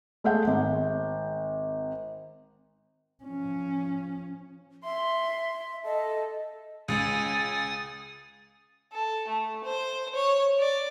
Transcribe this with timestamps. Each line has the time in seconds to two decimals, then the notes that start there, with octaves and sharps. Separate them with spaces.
0.24 G#3 A3 E5 F#5 G6
0.47 G#1
3.24 F3 C#4
4.84 E5 C6
5.85 A4 D#5
6.88 C#2 G#5 D#6 A6
8.92 A4
9.28 A3
9.64 C5
10.15 C#5
10.60 D5